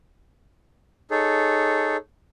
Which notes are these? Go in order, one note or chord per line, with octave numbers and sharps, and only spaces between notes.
D#4 G#4 A4 C#5